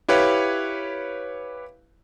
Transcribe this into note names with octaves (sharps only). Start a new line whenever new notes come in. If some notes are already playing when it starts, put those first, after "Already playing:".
E4 G4 B4 C#5 F5